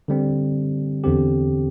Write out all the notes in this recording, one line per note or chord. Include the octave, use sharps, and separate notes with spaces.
D3 G3 C4
E2 D3 C4 G4